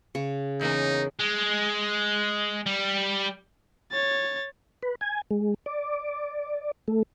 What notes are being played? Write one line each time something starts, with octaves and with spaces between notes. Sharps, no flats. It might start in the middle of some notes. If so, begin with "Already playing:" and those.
C#3 C#6
E2 A#3 C#4 D#4
G#3
G3
C#5 A6
B4
G#5
G#3
D5
A3